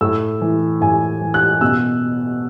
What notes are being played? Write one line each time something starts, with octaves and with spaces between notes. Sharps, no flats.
A2 E6
E3
A2 G#5
E3
F#6
B2 E6